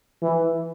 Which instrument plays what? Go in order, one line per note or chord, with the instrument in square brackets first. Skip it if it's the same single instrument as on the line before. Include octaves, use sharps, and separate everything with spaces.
[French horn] E3